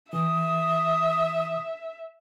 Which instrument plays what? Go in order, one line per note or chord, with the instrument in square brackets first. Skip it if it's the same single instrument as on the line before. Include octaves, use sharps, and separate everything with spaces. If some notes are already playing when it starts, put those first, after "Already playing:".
[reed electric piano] E3 [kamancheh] E5 [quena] D#6